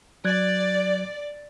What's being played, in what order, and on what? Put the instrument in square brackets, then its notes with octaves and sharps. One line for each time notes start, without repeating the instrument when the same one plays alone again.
[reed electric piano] F#3 F#6 G#6 [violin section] D5